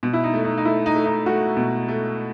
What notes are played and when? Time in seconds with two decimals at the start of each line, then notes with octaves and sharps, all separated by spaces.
0.03 B2
0.13 E4
0.24 D#4
0.34 A3
0.44 D#4
0.58 D#4
0.65 A3 E4
0.86 D#4
0.96 A3
1.06 D#4
1.26 A3 F#4
1.57 B2
1.88 A3